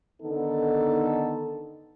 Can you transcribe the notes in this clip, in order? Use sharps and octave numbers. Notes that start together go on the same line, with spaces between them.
D3 D#3 B3 D#4 A4